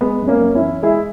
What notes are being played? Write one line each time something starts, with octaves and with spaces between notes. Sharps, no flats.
G#3 B3
F#2
A#3 C#4
F#2
C#4 E4
E3
G#3 E4 G#4